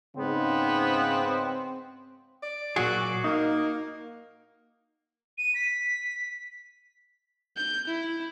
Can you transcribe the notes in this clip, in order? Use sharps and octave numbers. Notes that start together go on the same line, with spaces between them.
G#2 C#3 B3 C4
D5
A#2 F#3 F#4 G#4
A#3 D#4
D#7
B6
G6
E4